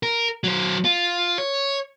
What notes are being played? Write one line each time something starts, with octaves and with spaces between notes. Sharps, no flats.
A#4
F#3 C5
F4
C#5